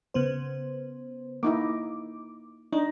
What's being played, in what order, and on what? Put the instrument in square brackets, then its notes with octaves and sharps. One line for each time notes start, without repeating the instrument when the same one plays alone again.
[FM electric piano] C#3 B3 C5
[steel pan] A#3 D#4 E4 [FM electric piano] D6
[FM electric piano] D4 [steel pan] D#4